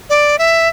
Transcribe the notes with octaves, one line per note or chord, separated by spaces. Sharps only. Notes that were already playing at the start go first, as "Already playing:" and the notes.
D5
E5